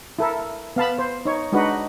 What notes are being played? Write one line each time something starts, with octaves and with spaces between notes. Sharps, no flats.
E4 A4 A#4
B3 F5 A5 B5
C5
D#4 C#5
G#3 D4 D#4 F#4 B4